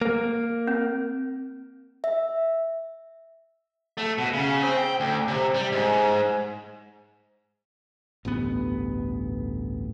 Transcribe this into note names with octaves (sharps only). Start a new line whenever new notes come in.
A#3
C4
E5
A3
B2
C#3
C4
G5
D2
C3
G3
G#2
A1 D2 G2 B3